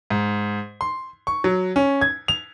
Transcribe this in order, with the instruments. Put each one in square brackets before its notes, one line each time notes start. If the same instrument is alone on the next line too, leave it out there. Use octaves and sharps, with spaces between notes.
[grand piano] G#2
C6
C#6
F#3
C#4
G#6
F7